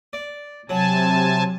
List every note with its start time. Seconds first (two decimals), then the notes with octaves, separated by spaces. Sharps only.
0.13 D5
0.69 C3 F#3 G#5 A5